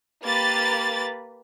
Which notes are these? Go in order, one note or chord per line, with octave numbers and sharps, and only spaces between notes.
A#3 G4 B4 A6